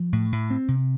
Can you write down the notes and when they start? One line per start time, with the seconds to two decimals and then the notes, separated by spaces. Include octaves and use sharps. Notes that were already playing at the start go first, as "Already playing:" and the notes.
Already playing: F3
0.13 A2
0.32 A2
0.50 C4
0.68 C3